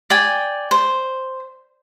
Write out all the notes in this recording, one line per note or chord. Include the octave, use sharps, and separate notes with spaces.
D5 G5 G#5
C5